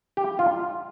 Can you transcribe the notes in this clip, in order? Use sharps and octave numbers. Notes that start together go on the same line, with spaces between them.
G4
F4